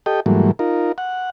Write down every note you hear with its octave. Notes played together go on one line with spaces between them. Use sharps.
G4 A4 D#5 G5
G#2 E3 F#3 G3 A3 A#3
D#4 F4 A#4
F#5